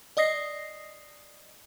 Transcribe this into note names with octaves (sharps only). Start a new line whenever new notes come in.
D5 D#5 D#6 A#6 C7